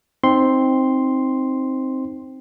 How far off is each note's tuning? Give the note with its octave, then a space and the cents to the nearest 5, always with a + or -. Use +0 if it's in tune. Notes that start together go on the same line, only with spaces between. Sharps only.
C4 +5 D#4 +0 C6 +0